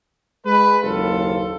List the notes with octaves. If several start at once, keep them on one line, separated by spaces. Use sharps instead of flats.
G#3 B4
F#1 D#2 F4 A4